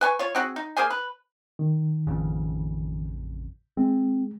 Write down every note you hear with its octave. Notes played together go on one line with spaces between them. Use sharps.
B4 G#5 C#6
F4 C#5
C4 F#4 G#4
D#4
A#3 G#4 C5 G#5
B4
D#3
A1 F2 C#3
G#3 C4